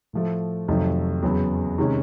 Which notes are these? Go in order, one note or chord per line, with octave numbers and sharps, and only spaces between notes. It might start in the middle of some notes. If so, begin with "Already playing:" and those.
A2 F3 A3
F2 C3 D#3 F#3 A3
E2 C#3 F#3 B3
C3 D#3 G#3 C#4